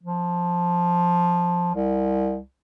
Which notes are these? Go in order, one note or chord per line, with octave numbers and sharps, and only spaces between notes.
F3
C2